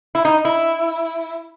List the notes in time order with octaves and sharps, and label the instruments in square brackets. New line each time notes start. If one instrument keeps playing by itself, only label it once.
[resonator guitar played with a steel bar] E4
D#4
E4